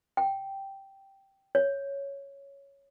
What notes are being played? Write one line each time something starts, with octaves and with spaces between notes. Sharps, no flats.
G5
C#5